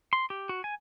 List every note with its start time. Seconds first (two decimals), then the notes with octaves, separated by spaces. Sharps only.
0.13 C6
0.30 G4
0.49 F#4
0.64 G#5